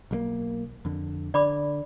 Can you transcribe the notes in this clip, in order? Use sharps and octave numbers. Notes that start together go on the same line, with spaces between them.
B1 G3 A#3
F2 D3
D3 D5 B5 D6